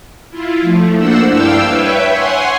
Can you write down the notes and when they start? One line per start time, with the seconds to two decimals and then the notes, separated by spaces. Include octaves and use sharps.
0.30 E4 F4
0.61 F3 A3
0.96 A3 A#3 D4 C5 F#5 E6
1.28 G2 D4 E4 F5 G5 E6
1.67 B4 C#5 E5 G5
2.08 C#5 F#5 G#5 C6